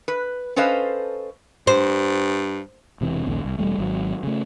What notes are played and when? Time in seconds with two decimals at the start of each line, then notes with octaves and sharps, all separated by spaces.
0.08 B4
0.56 C#4 A4 B4 C5 D#5 F5
1.67 G2 C5
3.01 E1 C3 E3
3.26 A#1 D#2 C#3
3.45 C2
3.58 E1 E2 G3 A3
3.78 G#1 F#3
4.23 C#3 A3